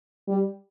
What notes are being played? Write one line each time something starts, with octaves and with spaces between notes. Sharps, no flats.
G3